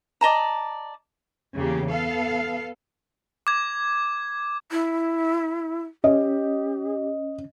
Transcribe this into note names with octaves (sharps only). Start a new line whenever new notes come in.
D5 D#5 A5 A#5
E2 C#3 A#3 G4
B3 A4 F5
D6 G#6
E4
C#4 G4 D#5